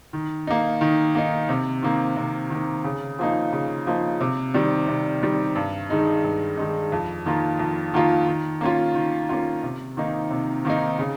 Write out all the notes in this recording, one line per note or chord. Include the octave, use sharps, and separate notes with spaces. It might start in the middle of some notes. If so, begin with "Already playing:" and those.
D#3
A#3 D#4
D#3
A#3 D#4
C3
D#3 A#3
C3
D#3 A#3
C#3
F3 A#3 D#4
C#3
F3 A#3 D#4
C3
D#3 G3
C3
D#3 G3
G2
D#3 G#3 D#4
G2
D#3 G#3 D#4
F2
D#3 A#3 F4
F2
D#3 A#3 F4
D#3
A#3 C#4 F4
D#3
A#3 C#4 F4
C3
D#3 A#3 D#4
C3
D#3 A#3 D#4
C#3